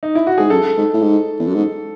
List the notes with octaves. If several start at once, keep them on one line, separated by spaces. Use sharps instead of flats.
D#4
E4
F#4
G#2 G#4
F#2 A4
G#2
A2
G#2
E2
F#2
G#2